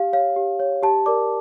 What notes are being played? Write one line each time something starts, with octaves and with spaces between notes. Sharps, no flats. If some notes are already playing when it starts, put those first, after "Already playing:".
Already playing: G4 F5
C#5 F5
G4
C#5
G4 A5
A#4 D5 D6